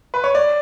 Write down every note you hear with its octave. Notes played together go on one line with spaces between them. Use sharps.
B4
C#5
D5